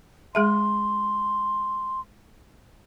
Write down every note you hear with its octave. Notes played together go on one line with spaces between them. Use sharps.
G#3 G#4 E5 C6